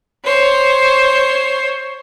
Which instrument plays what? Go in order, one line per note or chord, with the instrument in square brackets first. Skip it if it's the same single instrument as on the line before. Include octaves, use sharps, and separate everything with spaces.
[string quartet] C5 C#5